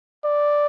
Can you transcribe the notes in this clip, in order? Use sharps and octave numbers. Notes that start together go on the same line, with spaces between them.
D5